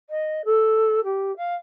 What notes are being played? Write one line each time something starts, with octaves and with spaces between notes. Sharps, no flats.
D#5
A4
G4
F5